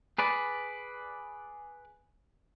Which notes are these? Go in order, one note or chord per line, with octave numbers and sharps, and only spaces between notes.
G#4 B4 D5